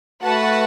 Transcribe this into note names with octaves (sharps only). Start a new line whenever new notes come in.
A3 F#4 B4 F#5 A5